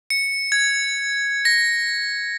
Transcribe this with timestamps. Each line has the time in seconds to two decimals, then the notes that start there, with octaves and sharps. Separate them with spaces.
0.10 C#7
0.52 G#6
1.45 A#6